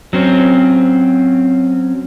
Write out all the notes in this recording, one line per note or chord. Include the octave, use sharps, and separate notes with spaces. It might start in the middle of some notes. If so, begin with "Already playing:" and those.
F#3 C4 C#4